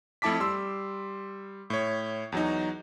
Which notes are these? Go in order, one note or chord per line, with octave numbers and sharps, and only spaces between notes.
F2 A3 E4 A5 D6 B6
G3 C6 E6
A2 C#5
E2 F#3 D#4